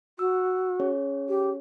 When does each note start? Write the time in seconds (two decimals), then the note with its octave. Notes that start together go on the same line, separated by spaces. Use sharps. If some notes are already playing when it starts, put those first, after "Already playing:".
0.19 F#4 E6
0.80 C#4 G#4 C#5
1.29 G4